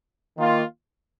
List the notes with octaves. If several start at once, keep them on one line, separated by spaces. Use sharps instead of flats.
D#3 A#3 F4